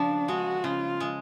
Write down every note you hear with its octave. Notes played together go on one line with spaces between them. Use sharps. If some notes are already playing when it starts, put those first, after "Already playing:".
Already playing: C#3 F3 D4
G#3 F#4
C#3 F4
G#3